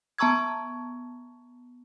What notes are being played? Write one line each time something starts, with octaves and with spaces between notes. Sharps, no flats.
B3 A5 A#5 C#6 E6 G#6